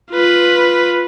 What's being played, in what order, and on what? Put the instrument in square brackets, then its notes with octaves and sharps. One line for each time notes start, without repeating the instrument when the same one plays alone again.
[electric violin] F4 B4